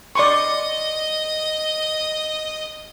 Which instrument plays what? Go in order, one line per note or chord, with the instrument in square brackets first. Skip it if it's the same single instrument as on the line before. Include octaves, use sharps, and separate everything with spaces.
[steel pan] D5 C6 C#6 [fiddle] D#5